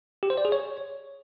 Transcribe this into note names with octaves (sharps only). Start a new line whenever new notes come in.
G4
C5
D5
G#4
C#5